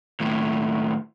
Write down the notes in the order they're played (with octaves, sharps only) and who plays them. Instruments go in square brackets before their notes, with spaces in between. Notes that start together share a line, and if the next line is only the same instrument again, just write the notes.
[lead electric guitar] D#2 A2